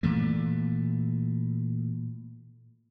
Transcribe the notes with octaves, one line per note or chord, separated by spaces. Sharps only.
A#2 E3 A3